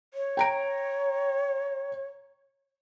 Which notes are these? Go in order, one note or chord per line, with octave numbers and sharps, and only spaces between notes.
C#5
G5 A#5 D7